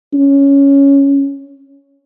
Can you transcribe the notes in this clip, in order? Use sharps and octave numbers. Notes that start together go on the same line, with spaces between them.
C#4